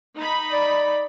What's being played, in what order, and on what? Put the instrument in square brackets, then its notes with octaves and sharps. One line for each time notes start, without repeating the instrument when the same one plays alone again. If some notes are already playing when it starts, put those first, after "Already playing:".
[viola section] D#4 B5
[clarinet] D5